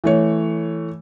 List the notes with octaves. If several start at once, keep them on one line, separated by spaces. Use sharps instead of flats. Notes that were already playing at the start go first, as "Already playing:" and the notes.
E3 A3 C#5